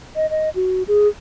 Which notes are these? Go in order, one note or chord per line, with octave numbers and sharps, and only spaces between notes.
D#5
D#5
F#4
G#4